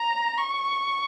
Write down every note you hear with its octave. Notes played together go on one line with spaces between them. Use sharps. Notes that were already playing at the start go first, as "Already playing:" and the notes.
Already playing: A#5
C#6